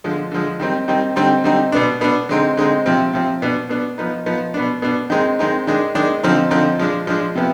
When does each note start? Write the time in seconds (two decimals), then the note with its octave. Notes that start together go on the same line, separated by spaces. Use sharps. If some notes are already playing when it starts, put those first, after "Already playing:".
0.04 D3 F3 G#3
0.32 D3 F3 G#3
0.60 D#3 G3 C4 D#4
0.88 D#3 G3 C4 D#4
1.16 D3 G3 C4 D#4
1.44 D3 G3 C4 D#4
1.72 B2 B3 D4
2.01 B2 B3 D4
2.29 D3 G#3 C4 D#4
2.57 D3 G#3 C4 D#4
2.86 C3 F3 C4
3.13 C3 F3 C4
3.42 B2 B3 D4
3.69 B2 B3 D4
3.98 F3 B3 D#4
4.26 F3 B3 D#4
4.54 B2 B3 D4
4.82 B2 B3 D4
5.10 D#3 G#3 C4 D#4
5.39 D#3 G#3 C4 D#4
5.67 D#3 G#3 D4
5.95 D#3 G#3 D4
6.23 D3 F3 C4 D#4
6.51 D3 F3 C4 D#4
6.79 F3 G#3 D4
7.07 F3 G#3 D4
7.35 C3 F3 B3